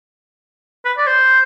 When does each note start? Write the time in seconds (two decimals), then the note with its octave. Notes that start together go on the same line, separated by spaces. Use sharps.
0.85 B4
0.97 D5
1.07 C5